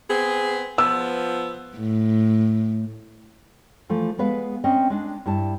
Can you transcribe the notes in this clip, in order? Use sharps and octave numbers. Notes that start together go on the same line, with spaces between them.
B3 C4 G#4
F3 B3 E6
A2
E3 F3 A3
G#3 B3 B4 F5
C4 C#4 D#5
G#3 D4
G2 E4 A5